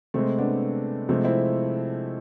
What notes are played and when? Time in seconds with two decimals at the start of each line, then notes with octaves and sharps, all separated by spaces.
0.14 C3 G#3 A3 C4
0.38 B3 D4
1.09 C3 F3 G#3 A3 C4
1.24 C4 E4